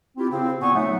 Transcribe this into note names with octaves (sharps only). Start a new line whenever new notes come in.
C4 E4 F4 G4
C#3 C4
A#2 B3 G#5 C#6
F#3 A3 D#4 F#5